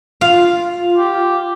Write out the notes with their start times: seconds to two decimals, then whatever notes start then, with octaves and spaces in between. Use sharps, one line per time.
0.21 F4 F5
0.97 G4